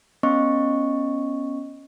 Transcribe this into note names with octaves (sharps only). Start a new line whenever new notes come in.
B3 C#4 D#5 C#6